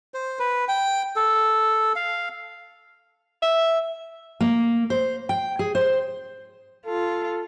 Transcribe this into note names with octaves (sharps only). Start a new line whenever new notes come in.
C5
B4
G5
A4
F5
E5
A#3
C5
G5
G#4
C5
F4 A4